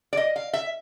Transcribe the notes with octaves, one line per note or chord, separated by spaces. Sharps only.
D5
D#5
F5
E5